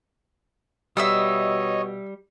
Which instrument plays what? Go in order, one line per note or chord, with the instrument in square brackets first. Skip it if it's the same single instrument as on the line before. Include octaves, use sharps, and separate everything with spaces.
[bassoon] B2 [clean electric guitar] G3 [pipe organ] C#5 D#5 [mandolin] E5 D#6 E6